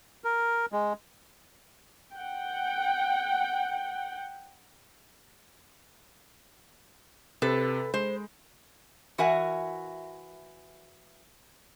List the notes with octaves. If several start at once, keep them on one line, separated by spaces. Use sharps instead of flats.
A#4
G#3
F#5 G5
C3 A4 B4
G#3 C5
E3 F#4 A#4 E5 F#5 G#5